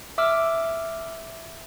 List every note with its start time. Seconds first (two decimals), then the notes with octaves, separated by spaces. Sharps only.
0.18 E5 D6 E6 F6